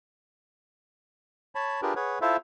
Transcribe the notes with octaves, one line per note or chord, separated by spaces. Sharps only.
C#5 A5 B5
D4 F4 G4 G#4 A#4 B4
G#4 B4 C#5 F#5
E4 F4 A4 C5 E5 F5